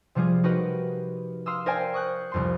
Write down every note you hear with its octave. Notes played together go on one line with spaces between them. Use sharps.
C3 F3 G3 F4 G#4
D#4 F#4 G4 A#4 B4 D#5
F5 C6 D#6 E6
A#4 C5 D5 F5 G5 G#5
C#6 D#6 F#6 G6
C2 F2 C6